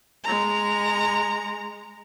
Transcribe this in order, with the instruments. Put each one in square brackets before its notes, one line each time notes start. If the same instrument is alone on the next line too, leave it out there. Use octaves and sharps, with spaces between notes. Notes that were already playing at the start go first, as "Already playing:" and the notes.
[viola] G#3 A#5